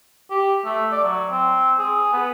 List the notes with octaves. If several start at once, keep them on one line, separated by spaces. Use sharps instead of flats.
G4
A3
D5
F#3
C4
G#4
B3